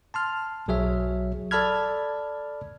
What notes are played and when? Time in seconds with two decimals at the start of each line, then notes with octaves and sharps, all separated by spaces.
0.14 A5 C6 F6
0.68 B1 F#3 G#4 C#5 E5
1.51 A4 D5 A5 B5 F6 G#6